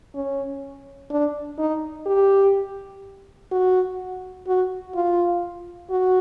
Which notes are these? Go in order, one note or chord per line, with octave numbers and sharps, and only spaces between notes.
C#4
D4
D#4
G4
F#4
F#4
F4
F#4